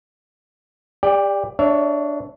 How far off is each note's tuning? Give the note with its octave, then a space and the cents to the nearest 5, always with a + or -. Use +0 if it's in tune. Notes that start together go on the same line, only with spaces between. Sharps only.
G4 +35 D5 +0 G5 +0
D4 +0 C#5 +25 E5 +0